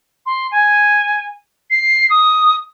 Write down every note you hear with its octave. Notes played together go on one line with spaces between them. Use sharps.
C6
G#5
C7
D#6